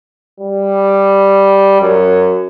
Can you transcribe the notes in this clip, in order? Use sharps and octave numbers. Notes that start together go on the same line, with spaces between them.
G3
F#2